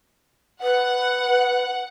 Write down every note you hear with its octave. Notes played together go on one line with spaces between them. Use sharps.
B4 F#5